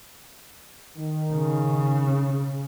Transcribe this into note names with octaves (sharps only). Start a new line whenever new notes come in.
D#3
C#3